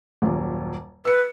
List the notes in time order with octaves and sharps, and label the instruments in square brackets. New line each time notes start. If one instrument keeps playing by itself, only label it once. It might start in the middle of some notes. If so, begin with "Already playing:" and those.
[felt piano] D#1 F#2 A#2
[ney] B4 [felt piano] E6 C#7